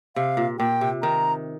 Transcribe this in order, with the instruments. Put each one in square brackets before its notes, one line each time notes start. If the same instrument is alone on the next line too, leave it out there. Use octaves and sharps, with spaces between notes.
[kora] C3 [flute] F5
[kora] A#2
[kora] A#2 [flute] G5
[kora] C3
[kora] D#3 [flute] A#5